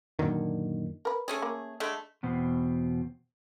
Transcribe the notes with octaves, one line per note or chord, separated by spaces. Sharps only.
F#2 A#2 D3 D#3
A#4 B4
A3 C#4 G#4
A#3
D3 G#3 A3
E2 B2 C4